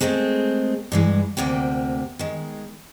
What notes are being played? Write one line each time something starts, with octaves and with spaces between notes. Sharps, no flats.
G#3 A3 C4 G#4 A#4
G2 E3 G#3
D2 C3 A#3 G5
D#3 G#3